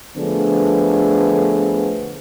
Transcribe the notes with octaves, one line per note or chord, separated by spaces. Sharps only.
D3 F3 A3 B3 D4 G#4